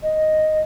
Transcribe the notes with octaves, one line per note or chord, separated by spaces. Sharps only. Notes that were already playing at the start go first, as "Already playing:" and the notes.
D#5